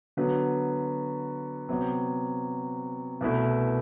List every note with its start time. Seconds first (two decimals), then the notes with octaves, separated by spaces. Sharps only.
0.17 D3 F#3 B3 F#4 B4
1.69 C3 F#3 B3
3.21 C2 B2 A3 E4 B4